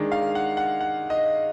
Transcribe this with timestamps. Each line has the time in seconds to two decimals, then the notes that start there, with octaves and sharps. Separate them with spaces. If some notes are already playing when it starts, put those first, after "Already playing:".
Already playing: D#3 G#3 D4
0.12 F5
0.35 F#5
0.57 F#5
0.81 F#5
1.10 D#5